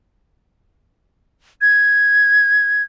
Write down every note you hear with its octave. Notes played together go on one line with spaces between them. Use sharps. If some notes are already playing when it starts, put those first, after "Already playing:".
G#6